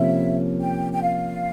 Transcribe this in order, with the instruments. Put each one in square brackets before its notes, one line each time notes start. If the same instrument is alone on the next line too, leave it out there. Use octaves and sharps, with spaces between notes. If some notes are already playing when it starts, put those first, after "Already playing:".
Already playing: [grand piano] C3 F3 A#3 C#4 [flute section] E5
[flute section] G5
G5
F5